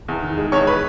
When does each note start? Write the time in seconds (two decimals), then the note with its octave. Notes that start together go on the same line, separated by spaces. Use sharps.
0.08 E2
0.22 D#3
0.38 G#3
0.52 E2 C#5 C#6
0.67 B4 B5